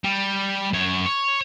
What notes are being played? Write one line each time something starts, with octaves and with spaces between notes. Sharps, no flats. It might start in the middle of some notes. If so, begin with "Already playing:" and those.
G3
F#2 C#5
C#5